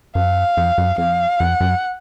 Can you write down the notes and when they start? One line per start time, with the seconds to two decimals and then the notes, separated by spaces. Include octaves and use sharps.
0.15 F#2 F5
0.57 F2
0.78 F#2
0.98 F2 F5
1.40 F2 F#5
1.60 F#2